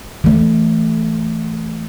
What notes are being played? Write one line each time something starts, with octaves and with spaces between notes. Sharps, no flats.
E3 A3